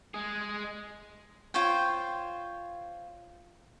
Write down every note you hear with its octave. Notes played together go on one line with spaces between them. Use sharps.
G#3 G#4
F4 C5 C#5 G5